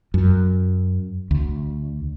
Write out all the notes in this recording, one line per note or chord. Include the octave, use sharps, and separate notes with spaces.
F#2
D2